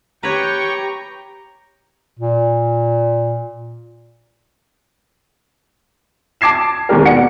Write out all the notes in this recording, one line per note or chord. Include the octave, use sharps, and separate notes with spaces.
G4 B4 C#5 G5 A#5 C#6
A#2
A5 D6 G#6 C7 E7
D#2 G#3 G4 A#4
B2 D5 F#5 C#7